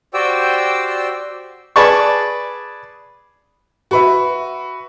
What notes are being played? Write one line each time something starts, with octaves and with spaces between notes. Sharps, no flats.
F#4 G4 C5 D5 G5 E6
G#4 B4 D5 A5 C#6
F#4 B4 E5